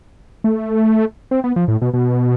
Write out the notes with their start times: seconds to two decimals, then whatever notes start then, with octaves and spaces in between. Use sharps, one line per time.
0.44 A3
1.31 C4
1.44 B3
1.56 F3
1.68 A2
1.82 B2
1.94 B2